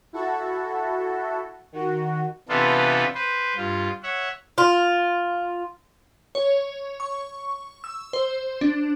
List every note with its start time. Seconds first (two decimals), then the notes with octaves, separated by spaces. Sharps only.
0.13 E4 F#4 A4
1.72 D#3 F#4
2.49 C3 E3 B3 D4 F4 A4
3.15 B4 C5
3.57 G2 F4
4.03 C#5 E5 F#5
4.58 F4
6.35 C#5
7.00 C#6
7.84 E6
8.13 C5
8.61 D4